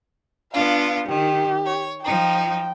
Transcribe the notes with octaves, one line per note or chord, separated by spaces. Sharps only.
B3 D4 F4 F5
D#3 G4
C#5
F3 D#4 G5